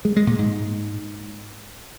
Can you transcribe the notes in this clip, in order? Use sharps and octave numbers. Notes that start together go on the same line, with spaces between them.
G#3
G#3
A#2
G#2